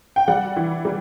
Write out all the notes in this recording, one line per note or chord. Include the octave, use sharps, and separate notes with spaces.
G5
G3 F#5
E3
G3